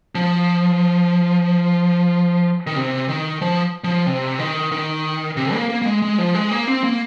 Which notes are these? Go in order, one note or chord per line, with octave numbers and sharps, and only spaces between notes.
F3
D#3
C3
D#3
F3
F3
C3
D#3
D#3
C3
A#3
A#3
A#3
G#3
G#3
F3
G#3
A#3
C4
A#3